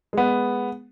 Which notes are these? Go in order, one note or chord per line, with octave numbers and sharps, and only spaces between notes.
G#3 B3